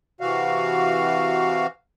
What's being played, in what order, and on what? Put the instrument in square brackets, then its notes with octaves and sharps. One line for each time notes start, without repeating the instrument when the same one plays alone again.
[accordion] C3 E3 F#4 F5